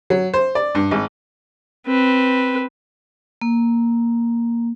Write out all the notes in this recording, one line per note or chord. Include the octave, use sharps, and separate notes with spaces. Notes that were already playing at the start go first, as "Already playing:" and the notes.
F#3
C5
D5
G2
G#1
C4 B4
A#3